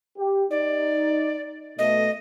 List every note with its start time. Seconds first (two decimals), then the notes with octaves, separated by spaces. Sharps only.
0.18 G4
0.51 D#4 D5
1.79 B2 A3 D#5